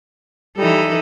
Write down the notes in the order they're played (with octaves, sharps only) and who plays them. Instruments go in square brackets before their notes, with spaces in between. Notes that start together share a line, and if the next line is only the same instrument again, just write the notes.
[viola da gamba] E3 D#4 A4 [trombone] G3